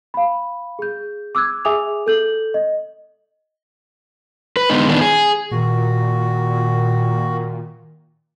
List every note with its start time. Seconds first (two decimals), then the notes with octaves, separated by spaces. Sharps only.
0.14 F5 B5
0.79 G#4 G6
1.35 D6 E6 F#6 G#6
1.65 G#4 E5 G#5 D6 D#6 F7
2.06 A4 G6 F#7
2.54 D#5
4.57 B4
4.70 D3 G#3 B3 D#4
4.88 D#3 A3 B3 D4 D#4
5.01 G#4
5.52 A#2 D#3 F#4